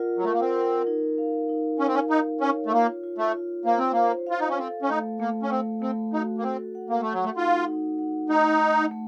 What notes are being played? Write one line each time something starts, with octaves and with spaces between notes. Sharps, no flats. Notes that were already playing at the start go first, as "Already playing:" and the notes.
Already playing: F4 A#4 D#5 F#5
F#3
A3 A#4
A#3
C4
A#4
D#4
F5
D#4
C#4 F5
C4
C#4
D#4 F5
C#4 C#5
A3
A#3 F4
F4
A3
F4
A#3 C5
C4
A#3 C5
F4 F5
D#4
C#4
C4 A4
C#4
A3 D#4
A3 A#3
C#4
A3 C4
A3 C4
D#4 F#4
A#3
C4 A4
F#5
A#3
A3 F#5
F#3
A3
D#4 F4
D#4
F#5
A3 D#4
A3
A3